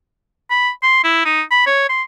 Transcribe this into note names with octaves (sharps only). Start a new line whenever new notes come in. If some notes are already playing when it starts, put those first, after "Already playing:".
B5
C6
E4
D#4
B5
C#5
C6